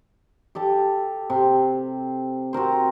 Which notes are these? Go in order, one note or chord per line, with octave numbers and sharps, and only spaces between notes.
G4 A4 D6
C3
C4 F#4 A#4 C5